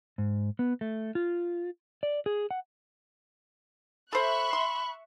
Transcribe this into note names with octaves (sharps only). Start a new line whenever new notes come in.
G#2
B3
A3
F4
D5
G#4
F#5
A4 C5 E5 B5 C#6 F#6
C6